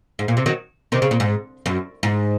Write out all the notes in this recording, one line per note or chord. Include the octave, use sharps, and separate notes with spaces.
G#2
A#2
C3
D#3 F#3
C3 D#3
C#3
A#2
G#2
F#2
G#2